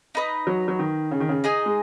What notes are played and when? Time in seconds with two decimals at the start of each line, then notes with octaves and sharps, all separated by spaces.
0.15 D#4 B4 D#5
0.47 F#3
0.68 F#3
0.79 D#3
1.11 C#3
1.20 D#3
1.29 C#3
1.44 D#4 G#4 D#5 G#5
1.66 G#3